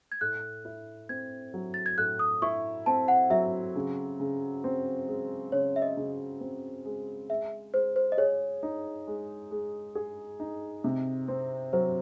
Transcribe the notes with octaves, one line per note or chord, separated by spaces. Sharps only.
G#6
A2 F#6
E4
C4 G#6
F#3
A6
G#6
A2 F#6
D#6
E4 C#6
C4 A5
F#5
F#3 E5
C#3
C#3
C4
G#3
C#3 C#5
E5
D#5
C#3
C4
G#3
G#3 E5
G#3 C5
C5
D#5
G#4 C#5
D#4
G#3
G#3
G#4
D#4
C3
C4
F#3 C5